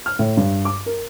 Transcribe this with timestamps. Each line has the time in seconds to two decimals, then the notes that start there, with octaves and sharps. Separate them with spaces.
0.06 F6
0.19 A2
0.37 G2
0.65 D6
0.86 A#4